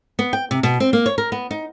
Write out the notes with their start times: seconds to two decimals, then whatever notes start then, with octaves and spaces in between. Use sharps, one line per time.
0.19 B3
0.33 G5
0.51 C3
0.63 B2
0.80 C4
0.93 A#3
1.06 C#5
1.18 A#4
1.32 B3
1.51 D#4